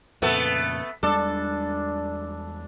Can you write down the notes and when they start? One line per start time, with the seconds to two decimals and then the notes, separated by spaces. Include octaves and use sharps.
0.22 F2 A#2 C#3 A3 B3 A4
1.03 E2 G3 G#3 D4 A4